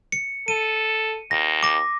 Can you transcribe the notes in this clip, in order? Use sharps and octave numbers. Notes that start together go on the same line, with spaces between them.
C#7
A4 D#7
D#2 A#6
D6 A#6